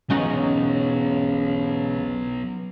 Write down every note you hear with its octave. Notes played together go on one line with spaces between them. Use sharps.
B1 E2 C#3 F#3 B3 C#4 D#4 F#4